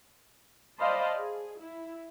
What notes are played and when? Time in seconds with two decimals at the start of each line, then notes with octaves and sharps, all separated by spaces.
0.80 C5 D5 D#5 F5 A5 B5
1.16 G#4
1.60 E4